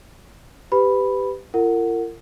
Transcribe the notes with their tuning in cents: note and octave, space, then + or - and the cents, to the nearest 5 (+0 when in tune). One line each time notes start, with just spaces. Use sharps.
G4 +0 B4 +25 B5 +0
F4 -45 A#4 -35 F#5 +0